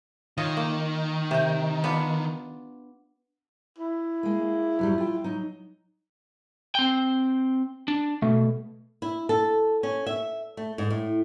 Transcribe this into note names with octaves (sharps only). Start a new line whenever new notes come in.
D#3 F4 C#5 D#5
A#3
C3 G5
B3 D4 F4
E4
G#3 A#3
F#2 F#3 G3
F4 G5
F#3 D#4
C4 G5
D4
B2 A3
E4
A4
C#4
E5
A3
G#2
A2